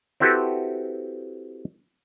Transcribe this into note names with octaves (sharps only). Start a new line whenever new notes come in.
C4 E4 F#4 G4 A4 B4